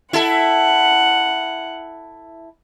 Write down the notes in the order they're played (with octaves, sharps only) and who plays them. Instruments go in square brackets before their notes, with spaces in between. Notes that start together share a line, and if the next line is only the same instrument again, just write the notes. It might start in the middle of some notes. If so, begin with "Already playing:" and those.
[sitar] E4 A4 [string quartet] F#5